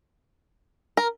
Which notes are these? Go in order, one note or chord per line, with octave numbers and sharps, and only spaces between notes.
A#4